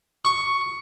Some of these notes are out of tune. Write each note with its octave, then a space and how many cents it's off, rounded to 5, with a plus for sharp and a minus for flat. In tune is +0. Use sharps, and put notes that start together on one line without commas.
C#6 +5